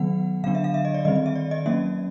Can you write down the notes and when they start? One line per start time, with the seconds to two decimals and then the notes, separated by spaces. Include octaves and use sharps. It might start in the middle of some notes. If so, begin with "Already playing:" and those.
Already playing: D#3 F#3 B3 F#5
0.44 D3 F#3 B3 D4 F5
0.55 E5
0.64 F5
0.74 E5
0.85 D#5
0.94 D5
1.05 D#3 G3 C4 D#5
1.16 D#5
1.26 E5
1.35 D5
1.51 D#5
1.66 F#3 A#3 C#4 E5